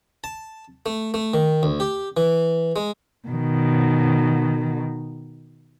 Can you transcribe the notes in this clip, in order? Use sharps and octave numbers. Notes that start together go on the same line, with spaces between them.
A5
A3
A3
D#3
D2
G4
E3
G#3
B2 D#3